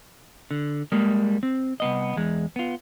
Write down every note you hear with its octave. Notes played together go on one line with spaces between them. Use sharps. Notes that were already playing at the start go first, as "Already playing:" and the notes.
D3
G3 G#3 A#3
C4
C2 B3 D#5
E2 G#3
B3 F4